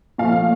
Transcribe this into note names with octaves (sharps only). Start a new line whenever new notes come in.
A#2 F3 A3 F5